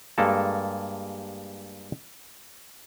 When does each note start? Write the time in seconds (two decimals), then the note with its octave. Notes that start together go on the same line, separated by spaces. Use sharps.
0.18 G2 G#3 A#3 A4 A5